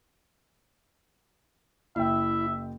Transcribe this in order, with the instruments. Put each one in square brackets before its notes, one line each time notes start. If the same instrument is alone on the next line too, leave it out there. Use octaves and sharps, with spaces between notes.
[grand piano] F#1 G5 [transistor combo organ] E4 [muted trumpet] E5